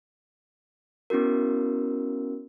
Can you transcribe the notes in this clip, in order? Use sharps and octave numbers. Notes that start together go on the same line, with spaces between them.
B3 C#4 E4 F#4 A#4